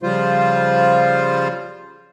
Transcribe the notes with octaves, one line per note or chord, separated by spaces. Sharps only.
C#3 F3 G3 F4 C5